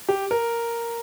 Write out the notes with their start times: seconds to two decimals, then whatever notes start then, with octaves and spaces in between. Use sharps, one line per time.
0.09 G4
0.31 A#4